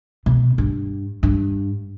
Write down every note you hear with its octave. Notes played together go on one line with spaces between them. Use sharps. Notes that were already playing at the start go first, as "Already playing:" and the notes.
B2
G2
G2